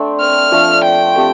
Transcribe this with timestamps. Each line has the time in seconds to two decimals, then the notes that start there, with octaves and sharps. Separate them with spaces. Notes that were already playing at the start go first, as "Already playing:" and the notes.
Already playing: A3 C4 D4 A4 D5
0.20 F6
0.52 F3 A3 D4 A4
0.84 G5
1.16 A3 C4 G4